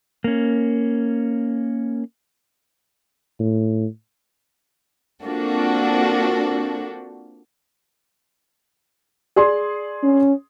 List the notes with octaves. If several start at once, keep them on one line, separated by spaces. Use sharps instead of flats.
A#3 C#4
A2
A#3 C4 D4 F4 F#4 A4
G#4 D5 C6
C#4